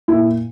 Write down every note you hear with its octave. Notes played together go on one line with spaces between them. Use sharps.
A#2 E4